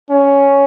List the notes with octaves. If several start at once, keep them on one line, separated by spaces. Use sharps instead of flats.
C#4